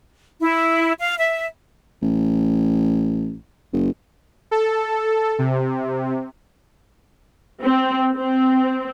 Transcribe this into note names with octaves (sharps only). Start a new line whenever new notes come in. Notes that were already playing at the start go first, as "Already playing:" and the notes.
E4
F5
E5
A1
F#1
A4
C3
C4
C4